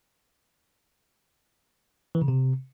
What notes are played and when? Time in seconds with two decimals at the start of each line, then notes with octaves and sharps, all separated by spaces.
2.15 E3
2.22 C#3
2.28 C3